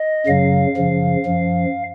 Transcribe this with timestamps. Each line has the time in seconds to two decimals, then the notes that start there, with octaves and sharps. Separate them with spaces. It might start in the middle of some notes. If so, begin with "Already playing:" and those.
Already playing: D#5
0.26 F#2 C#3 F#3 F5
0.77 F#2 C#3 F3
1.26 F#2 F3